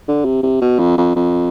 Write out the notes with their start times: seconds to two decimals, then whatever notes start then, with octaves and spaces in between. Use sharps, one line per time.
0.08 D3
0.25 C3
0.43 C3
0.61 B2
0.79 F2
0.97 F2
1.15 F2